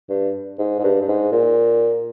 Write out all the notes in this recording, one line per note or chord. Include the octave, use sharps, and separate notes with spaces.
G2
G#2
G#2
G2
G2
G#2
A#2